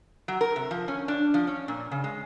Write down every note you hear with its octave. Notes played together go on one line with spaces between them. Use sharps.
F#3
A#4
C3
F3
C#4
D4
F3
C#4
A#2
C#3
G#3